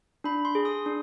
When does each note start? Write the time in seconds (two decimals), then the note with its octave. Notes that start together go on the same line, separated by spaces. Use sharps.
0.24 D4 B5
0.45 C6
0.55 G#4
0.65 D#6
0.86 D4